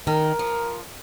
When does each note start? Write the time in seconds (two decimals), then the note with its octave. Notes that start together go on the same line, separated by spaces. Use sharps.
0.07 D#3 A#4
0.39 F3